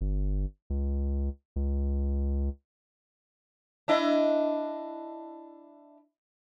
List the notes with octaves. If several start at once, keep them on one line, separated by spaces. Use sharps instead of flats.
G1
C#2
C#2
D4 E4 D#5